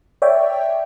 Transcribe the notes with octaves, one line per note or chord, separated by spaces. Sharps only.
C#5 D5 E5 G5